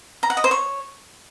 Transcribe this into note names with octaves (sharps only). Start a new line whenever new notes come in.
A#5
F#5
D#5
C5
C#5